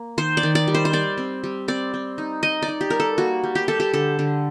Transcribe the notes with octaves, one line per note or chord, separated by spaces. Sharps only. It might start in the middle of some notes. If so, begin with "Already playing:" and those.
Already playing: A#3
D#3 C5
D5
D#3
D5
G3
C5
C5
G3 D5
C4
G3
C4 D5
C4
D#4
D#4 D#5
D5
D#4
G4
G3 A#4
A4
A#3 F#4
G3
G4
G3 A4
G4
D3 A4
D3